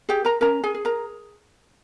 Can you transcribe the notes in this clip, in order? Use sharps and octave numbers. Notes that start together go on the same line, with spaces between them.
G4 G#4 G5
A#4 A#5
C#4 A#4 A#5
G#4 G#5
G#4
A#4 A#5